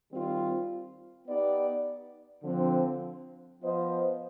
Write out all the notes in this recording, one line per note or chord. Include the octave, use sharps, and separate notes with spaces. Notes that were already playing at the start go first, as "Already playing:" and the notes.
D#3 G3 C4 F4
B3 D#4 G4 D5
D3 F3 C4
F3 B3 F4 C5 D#5